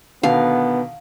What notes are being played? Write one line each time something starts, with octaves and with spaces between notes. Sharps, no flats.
B2 D3 D#3 B3 F5